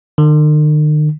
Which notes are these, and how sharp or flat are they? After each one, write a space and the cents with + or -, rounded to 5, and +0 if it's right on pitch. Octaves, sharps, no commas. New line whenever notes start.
D#3 -45